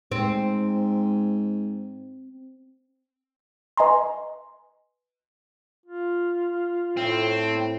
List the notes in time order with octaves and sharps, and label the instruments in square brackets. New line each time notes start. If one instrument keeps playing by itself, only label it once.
[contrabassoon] G#2 [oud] C4
[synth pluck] B4 D#5 G#5 A#5 C6
[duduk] F4
[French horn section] A2 [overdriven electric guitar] C4